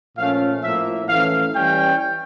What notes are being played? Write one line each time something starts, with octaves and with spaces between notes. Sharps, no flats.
A#2 F3 A3 C#4 F5
A2 F3 A#3 E5
E3 A3 C#4 F5
E3 G3 C#4 G5